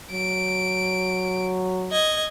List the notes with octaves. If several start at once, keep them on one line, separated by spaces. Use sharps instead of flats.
F#3 D7
D#5 G#6